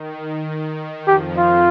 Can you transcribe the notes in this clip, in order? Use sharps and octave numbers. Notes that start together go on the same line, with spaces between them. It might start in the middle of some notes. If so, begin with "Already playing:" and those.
Already playing: D#3
F2 F3 G4
F4